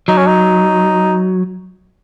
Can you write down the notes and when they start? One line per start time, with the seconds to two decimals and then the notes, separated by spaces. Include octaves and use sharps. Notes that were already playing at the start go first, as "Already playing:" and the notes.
0.08 F#3 D#4
0.17 C#4
0.27 D#4